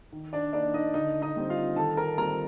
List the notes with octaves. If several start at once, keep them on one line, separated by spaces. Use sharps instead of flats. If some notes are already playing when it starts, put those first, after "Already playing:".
D#3
D4 D5
A#3 D4 D#4 D5
D#4 D#5
D3 D#4 D#5
D#4 D#5
G3 C4
F4 F5
D#3 A4 A5
A#4 A#5
G3 C4 F4 A#4 A#5